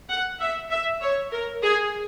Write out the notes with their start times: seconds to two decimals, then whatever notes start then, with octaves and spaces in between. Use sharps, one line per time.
0.09 F#5
0.40 E5
0.70 E5
1.02 C#5
1.31 A#4
1.63 G#4